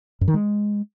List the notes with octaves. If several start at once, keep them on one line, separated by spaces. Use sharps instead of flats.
F#2
D#3
G#3